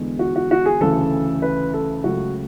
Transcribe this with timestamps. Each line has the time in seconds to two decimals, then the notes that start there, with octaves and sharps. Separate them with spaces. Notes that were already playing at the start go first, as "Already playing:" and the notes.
Already playing: E2 D3 G#3 B3
0.19 F#4
0.36 F#4
0.51 F#4
0.66 G#4
0.81 D2 C#3 E3 A4
1.42 B4
1.74 A4
2.04 C#2 C#3 F#3 A3 F#4